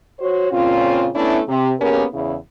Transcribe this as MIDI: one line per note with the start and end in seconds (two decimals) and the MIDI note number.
0.20 0.51 66
0.20 0.51 72
0.20 0.51 73
0.52 1.09 46
0.52 1.09 49
0.52 1.09 60
0.52 1.09 61
0.52 1.09 65
1.15 1.40 57
1.15 1.40 59
1.15 1.40 61
1.15 1.40 62
1.15 1.40 64
1.48 1.71 48
1.80 2.05 58
1.80 2.05 59
1.80 2.05 61
1.80 2.05 67
1.80 2.05 68
1.80 2.05 70
2.14 2.36 40
2.14 2.36 49
2.14 2.36 64